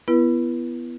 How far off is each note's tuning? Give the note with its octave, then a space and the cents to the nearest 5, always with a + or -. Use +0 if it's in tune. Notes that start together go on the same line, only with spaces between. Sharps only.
B3 +0 E4 +30 B4 -40